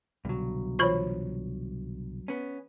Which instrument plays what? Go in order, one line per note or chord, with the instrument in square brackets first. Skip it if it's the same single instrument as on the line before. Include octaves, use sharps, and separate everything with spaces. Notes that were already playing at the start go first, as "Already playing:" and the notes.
[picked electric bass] C2 B2 D3 [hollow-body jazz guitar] G2 F#3
[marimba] E3 F4 C5 [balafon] C#5 B5 C#6
[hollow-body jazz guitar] B3 C#4